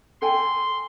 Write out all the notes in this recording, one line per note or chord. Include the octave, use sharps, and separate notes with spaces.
A4 G5 G#5 C6